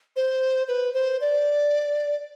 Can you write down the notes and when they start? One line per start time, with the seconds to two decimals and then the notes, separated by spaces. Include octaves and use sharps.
0.16 C5
0.68 B4
0.94 C5
1.21 D5